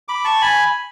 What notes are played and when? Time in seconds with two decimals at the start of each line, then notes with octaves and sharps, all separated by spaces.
0.08 B5 D6
0.25 A5 C#6
0.41 G#5 B5